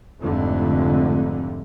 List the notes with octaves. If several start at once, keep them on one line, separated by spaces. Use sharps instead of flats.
F1 F2 G#2 D3 A3